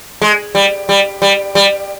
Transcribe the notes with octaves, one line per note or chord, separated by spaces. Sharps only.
G#3
G3
G3
G3
G3